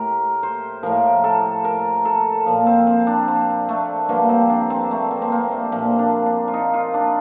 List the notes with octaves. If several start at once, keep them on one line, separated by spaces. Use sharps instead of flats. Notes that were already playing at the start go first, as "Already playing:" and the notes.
Already playing: A2 G4 A#4
C5
A2 F3 A#4
A4
A#4
A4
A#2 F3
C4
C4
D4
C4
A3
G2 D3 F3 A#3
C4
D4
C4
A3
A#3
C4
A#3
A3
A#2 F3 A#3
D4
D4
F4
D#4
F4
D4